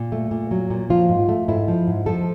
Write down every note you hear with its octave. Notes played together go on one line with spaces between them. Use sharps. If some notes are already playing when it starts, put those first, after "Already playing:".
Already playing: A#2
A3
A#2
F#3
A#2
F3 F4
G#2
A3
G#2 E4
F3
G#2
F3 A4